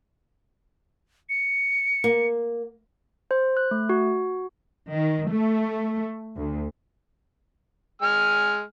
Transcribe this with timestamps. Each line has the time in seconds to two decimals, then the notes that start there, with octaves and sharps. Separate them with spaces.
1.29 C#7
2.04 A#3
3.31 C5
3.57 F#6
3.71 A3
3.89 F#4
4.91 D#3
5.30 A3
6.36 D2
8.02 G#3 G#5 F6